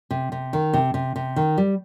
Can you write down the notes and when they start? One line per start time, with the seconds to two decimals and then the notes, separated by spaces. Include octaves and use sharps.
0.11 C3
0.32 C3
0.53 D#3
0.74 C3
0.94 C3
1.16 C3
1.36 D#3
1.58 G3